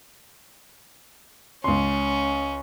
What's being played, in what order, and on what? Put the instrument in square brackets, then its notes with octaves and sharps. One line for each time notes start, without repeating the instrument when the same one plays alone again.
[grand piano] C#2 C6 [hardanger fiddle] C#4